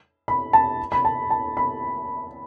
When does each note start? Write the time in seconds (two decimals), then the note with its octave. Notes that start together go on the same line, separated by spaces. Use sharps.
0.28 B5
0.53 A5
0.92 B5
1.05 A5
1.30 A5
1.57 B5